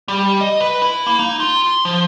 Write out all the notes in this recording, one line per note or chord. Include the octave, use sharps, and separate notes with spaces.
G3
D#5
B4
E4
A#3
D#4
F4
C6
F3